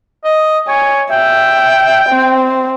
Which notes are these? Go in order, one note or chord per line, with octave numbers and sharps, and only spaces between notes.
D#5
C#5 G#5
E5 G5
C4